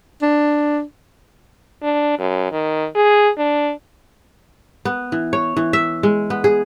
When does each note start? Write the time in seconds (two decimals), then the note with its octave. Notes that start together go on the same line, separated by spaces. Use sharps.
0.22 D4
1.83 D4
2.19 F#2
2.52 D#3
2.96 G#4
3.38 D4
4.85 B3
5.12 E3
5.33 C#5
5.57 E3
5.73 E5
6.03 G#3
6.30 B3
6.44 G#4